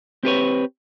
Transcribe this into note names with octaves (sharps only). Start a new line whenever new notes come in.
C4 G4 B4 C#5